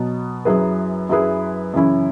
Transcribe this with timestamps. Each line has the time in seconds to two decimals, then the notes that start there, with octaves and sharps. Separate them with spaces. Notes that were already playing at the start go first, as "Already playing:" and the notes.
Already playing: B2 F#3 B3
0.45 F#2 F#3 E4 G#4 B4
1.09 F#2 F#3 E4 G#4 B4
1.74 F#2 C#3 E3 C#4 E4